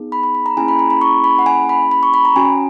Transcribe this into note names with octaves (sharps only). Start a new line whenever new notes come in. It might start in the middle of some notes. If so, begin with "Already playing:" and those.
Already playing: B3 D#4 G#4
B5
B5
B5
A#5
A#3 C#4 E4 G#4 G#5
B5
A#5
B5
C#6
B5
F#5
G#5
B5
B5
C#6
B5
A#5
C#4 F#4 G#5